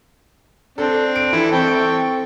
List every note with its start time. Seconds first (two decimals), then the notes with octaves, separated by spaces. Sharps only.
0.78 C4 D4 A4
1.16 D7
1.33 E3 E4 A4
1.52 C4 A4 G5 C#6